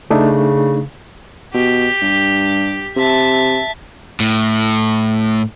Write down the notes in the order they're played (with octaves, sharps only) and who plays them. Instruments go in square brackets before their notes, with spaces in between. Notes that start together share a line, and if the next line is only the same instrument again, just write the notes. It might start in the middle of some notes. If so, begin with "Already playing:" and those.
[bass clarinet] C#3 [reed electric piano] A3 D4 D#4
[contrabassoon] B2 [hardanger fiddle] G4
[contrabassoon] G2
[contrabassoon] C3 [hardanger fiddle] E5 A5
[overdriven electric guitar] A2